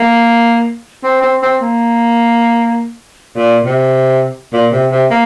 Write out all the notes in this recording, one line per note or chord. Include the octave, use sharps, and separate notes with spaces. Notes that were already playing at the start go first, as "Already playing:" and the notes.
Already playing: A#3
C4
C4
C4
A#3
A#2
C3
A#2
C3
C3
A#3